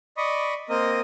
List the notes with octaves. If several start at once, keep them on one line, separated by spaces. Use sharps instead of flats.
D5 D#5 B5 C#6 D#6
A#3 C4 A#4 D#5 D#6